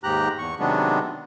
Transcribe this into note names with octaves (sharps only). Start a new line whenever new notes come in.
D#2 G#2 G4 A#5 F#6
E2 C#6
C3 D#3 F#3 G#3 B3 D4